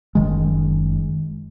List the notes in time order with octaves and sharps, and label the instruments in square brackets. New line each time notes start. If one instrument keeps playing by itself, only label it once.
[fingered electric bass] F#1 D#3 G#3